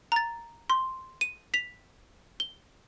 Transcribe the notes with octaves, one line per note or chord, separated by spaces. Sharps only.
A#5 A6
C6
D#7
B6 F7
G7